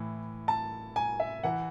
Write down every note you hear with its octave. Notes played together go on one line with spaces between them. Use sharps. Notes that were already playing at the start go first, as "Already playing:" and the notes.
Already playing: A2 E3
A5
G#5
E5
E3 F#5